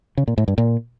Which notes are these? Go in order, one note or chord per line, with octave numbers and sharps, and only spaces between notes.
C#3
A#2
A2
G2
A#2